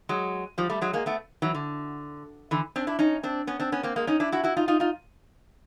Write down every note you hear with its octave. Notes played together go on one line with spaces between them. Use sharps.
F#3 G#3
F3 G3
G3 A3
F#3 G#3
G#3 A#3
A3 B3
E3 F#3
D3
D3 E3
C4 D4
D4 E4
C#4 D#4
C4 D4
B3 C#4
C4 D4
B3 C#4
A#3 C4
G#3 A#3
C#4 D#4
D4 E4
E4 F#4
E4 F#4
D#4 F4
D#4 F4
D#4 F4